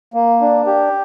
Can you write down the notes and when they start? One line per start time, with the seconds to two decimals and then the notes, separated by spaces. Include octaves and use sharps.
0.14 A#3
0.41 D4
0.66 G4